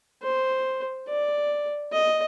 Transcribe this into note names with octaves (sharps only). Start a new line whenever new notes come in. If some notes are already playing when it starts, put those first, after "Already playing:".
C5
D5
D#5